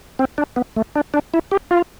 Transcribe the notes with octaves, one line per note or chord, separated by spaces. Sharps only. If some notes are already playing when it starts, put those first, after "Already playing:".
C4
D4
B3
A3
D4
D4
E4
G4
F4